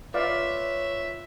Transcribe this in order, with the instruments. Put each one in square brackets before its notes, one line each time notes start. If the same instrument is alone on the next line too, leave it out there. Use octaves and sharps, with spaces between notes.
[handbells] F4 B4 [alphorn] C#5 [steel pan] D5 F5 [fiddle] E5